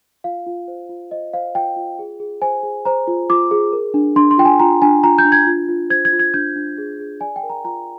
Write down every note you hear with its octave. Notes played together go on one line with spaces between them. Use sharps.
F4 F5
F4
C5
F4
C5 D#5
C5 F5
F4 G5
F4
G#4
G#4
C5 G#5
G#4
C5 A#5
F4
F4 D6
G#4
A#4
D4
D4 C6
C6
F4 G5
G#5
F4 A#5
D4 G#5
F4 A#5
G6
D4
G#6
F4
F4
C5 G#6
G#6
F4
G#6
D4 G6
D4
G#4
G#4
D5 G#5
G5
A#4
A#5
F4 A#5